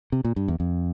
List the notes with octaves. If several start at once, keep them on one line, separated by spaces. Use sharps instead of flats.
C3
A#2
G2
E2
F2